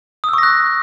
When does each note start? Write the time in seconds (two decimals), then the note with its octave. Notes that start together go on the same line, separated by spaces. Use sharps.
0.24 D#6
0.29 E6
0.33 C#6
0.38 A#6
0.43 F#6